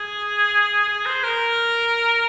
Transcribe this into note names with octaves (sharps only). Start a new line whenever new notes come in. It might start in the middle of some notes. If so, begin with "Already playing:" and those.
Already playing: G#4
G#4
C5
A#4